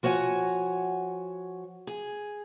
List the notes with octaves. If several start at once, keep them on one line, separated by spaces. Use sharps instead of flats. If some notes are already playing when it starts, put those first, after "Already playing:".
F3 F#4 C#5 F#5 G#5
G#4